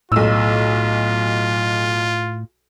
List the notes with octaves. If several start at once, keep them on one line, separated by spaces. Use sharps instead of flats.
B1 A2 F4 E6